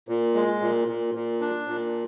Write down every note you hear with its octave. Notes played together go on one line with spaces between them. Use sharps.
A#2
G#3
A#2
A#2
A#2
D4
A#2